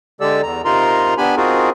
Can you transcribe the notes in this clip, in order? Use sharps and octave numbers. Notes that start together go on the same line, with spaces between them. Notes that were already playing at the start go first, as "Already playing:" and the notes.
D3 G#3 G4 A4 D5 E6
E2 A#5
C3 D#4 F4 A#4 A#5 C6
B3 D4 G4 G#5 B5
C4 D#4 F4 F#4 G#4 A#4